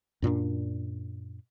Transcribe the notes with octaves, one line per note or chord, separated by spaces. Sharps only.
F#2 A#2 C4 D4